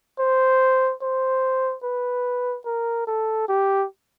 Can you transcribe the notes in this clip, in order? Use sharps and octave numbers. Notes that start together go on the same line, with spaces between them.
C5
C5
B4
A#4
A4
G4